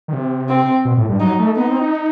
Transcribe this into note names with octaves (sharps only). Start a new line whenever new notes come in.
D#3
C3
C4
B2
A2
G2
F#3 D#4
A3
B3 D#4
C4
D#4